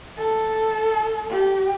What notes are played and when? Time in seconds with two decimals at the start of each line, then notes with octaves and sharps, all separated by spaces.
0.18 A4
1.31 G4